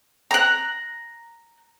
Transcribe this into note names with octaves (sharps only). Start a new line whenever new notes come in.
A#5 F#6